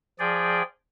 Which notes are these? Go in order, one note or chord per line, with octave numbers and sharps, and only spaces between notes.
F3 G#4 D5 G5